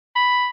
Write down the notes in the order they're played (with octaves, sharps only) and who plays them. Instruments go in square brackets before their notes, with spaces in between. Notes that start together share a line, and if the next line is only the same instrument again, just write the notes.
[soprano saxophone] B5